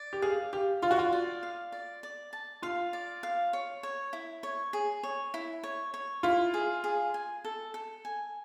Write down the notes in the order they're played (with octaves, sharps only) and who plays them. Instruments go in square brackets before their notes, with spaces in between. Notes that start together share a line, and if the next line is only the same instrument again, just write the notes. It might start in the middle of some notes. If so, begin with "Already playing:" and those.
Already playing: [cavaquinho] D5
[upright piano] G4
[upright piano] G#4 [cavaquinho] F5
[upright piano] G4 [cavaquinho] F5
[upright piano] F4 [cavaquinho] D5
[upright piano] F#4
F4
[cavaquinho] D5
F5
D5
D5
A5
[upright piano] F4 [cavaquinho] F5
[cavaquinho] D5
F5
C#5
C#5
E4
C#5
G#4
C#5
E4
C#5
C#5
[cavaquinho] E4 [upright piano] F4
[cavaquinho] G#4
G#4
G#5
A4
A4
G#5